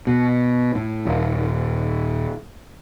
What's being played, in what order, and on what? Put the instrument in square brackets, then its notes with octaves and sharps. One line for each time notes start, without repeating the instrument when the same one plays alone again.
[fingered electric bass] B2
A2
D#1